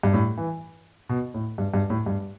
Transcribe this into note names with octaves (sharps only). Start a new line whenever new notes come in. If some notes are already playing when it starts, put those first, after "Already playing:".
G2
A2
E3
B2
A2
G2
G2
A2
G2